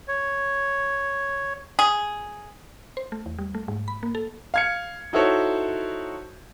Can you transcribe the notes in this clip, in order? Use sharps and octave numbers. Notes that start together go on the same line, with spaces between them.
C#5
G#4
C5
A3
E2
G3
A3
G#2
B5
A#3
A4
F5 G#6 C#7
D#4 E4 F#4 A4 C5 C#5